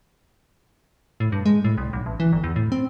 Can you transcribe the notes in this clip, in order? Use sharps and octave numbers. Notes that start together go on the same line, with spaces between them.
A2
G2
G#3
A2
C2
B1
A1
E3
G1
E2
A2
C4